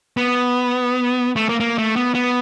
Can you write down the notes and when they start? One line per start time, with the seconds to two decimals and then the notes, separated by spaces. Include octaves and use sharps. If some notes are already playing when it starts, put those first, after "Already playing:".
0.17 B3
1.36 A3
1.49 A#3
1.60 A#3
1.78 A3
1.96 B3
2.14 B3